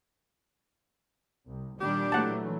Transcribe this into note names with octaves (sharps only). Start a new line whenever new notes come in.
C2
A#2 D#3 G3 D4 G4
E3 F#3 A3 F#5 A5